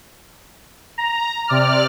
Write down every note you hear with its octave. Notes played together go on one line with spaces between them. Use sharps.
A#5
C3 D5 F6